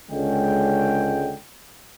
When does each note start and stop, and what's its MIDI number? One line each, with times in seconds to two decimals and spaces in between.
0.11 1.35 37
0.11 1.35 50
0.11 1.35 56
0.11 1.35 61
0.11 1.35 79